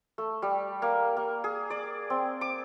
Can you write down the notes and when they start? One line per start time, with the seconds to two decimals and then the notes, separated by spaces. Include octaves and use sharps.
0.18 A3
0.42 G3
0.82 A#3
1.16 A#3
1.44 G#4
1.70 D5
2.10 C4
2.41 D6